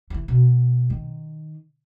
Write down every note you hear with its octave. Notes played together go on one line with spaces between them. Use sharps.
E3 F#3
B2
D#3